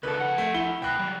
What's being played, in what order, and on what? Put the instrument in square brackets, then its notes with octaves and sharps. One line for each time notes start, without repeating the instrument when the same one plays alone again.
[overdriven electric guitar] C#2 A4 [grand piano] B4
[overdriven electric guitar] F2 F#5
[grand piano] A3
E4 G7
[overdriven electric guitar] B2 B5 [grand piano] G5 F#6
[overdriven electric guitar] F#3 G3